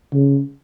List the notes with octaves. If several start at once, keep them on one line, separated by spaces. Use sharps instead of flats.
C#3